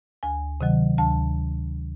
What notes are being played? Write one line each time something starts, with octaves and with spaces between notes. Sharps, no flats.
D2 G#5
C3 D#3 F#3
D2 A5